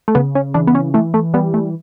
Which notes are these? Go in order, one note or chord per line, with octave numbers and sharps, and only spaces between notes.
A3
C#3 B3
C#4
E3 D4
B3
C#4
E3 A3
A3
G3 B3
A3